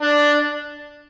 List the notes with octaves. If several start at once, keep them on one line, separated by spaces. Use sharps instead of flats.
D4